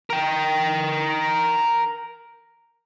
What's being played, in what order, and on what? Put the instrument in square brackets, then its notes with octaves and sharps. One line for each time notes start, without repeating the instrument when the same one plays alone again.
[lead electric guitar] A#4 G5